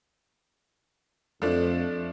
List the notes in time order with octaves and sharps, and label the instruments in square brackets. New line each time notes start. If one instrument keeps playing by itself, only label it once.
[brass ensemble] F2 [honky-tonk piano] F3 A3 D4